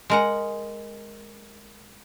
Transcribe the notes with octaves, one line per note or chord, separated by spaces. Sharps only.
G#3 A#4 F#5